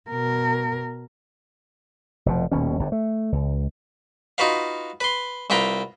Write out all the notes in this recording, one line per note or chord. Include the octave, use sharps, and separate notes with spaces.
B2 A#4
F1 B2 F3
D#1 D#2 B2 C#4
G1 G2
A3
C#2
D#4 F4 F#4 B4 F5
B4 C6
C2 F4 B4 G5 A#5